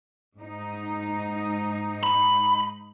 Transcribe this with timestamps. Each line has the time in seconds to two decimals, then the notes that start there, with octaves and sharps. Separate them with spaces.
0.38 G#2 D#4
2.03 B5